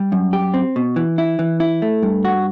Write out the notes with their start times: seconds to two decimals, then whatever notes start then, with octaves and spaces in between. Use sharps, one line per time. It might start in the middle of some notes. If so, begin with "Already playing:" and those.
Already playing: G3
0.12 F#2
0.33 G4
0.54 C4
0.76 B2
0.96 E3
1.18 E4
1.39 E3
1.60 E4
1.82 A3
2.03 G2
2.25 F#4